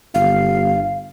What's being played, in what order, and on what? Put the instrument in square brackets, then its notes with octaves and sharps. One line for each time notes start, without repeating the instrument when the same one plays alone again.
[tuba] G1 [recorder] F5